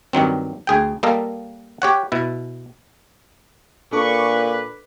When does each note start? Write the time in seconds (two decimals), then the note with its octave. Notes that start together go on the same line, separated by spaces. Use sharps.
0.13 G2 D#3 F#3 C4
0.67 D2 G#4 G5
1.03 G3 A#3 A4 A#4 D#5 F5
1.82 G4 C#5 F#5
2.12 B2 E4
3.93 A#2 D4 A4 B4 C#6 D6